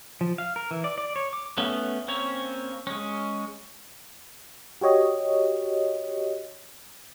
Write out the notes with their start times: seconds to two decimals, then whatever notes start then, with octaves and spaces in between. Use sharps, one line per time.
0.21 F3
0.38 F5
0.56 A#4
0.71 E3
0.84 D5
0.98 D5
1.16 C#5
1.33 D6
1.58 A3 B3 C#4
2.08 A#3 C4 C#4 C#5
2.87 G#3 C#4
4.81 F#4 G4 C#5 D#5